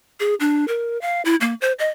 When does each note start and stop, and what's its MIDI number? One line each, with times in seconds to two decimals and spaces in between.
0.20 0.35 68
0.40 0.67 62
0.68 1.00 70
1.01 1.22 77
1.25 1.36 64
1.41 1.54 58
1.61 1.73 72
1.79 1.89 75